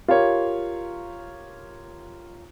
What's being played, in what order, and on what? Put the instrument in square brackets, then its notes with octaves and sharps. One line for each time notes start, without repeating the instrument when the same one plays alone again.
[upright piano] F4 G4 A#4 C#5